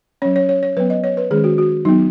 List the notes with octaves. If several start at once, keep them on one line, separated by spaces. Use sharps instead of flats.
F#3 C#4 C#5
C#5
C#5
C#5
F#3 B3 B4
D#5
C#5
B4
D#3 G#3 C#4 G#4
F#4
F#4
F#3 B3 D#4